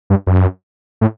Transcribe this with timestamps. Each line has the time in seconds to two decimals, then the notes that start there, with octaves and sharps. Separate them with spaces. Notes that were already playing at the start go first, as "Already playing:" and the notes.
0.10 G2
0.27 F#2
1.01 A2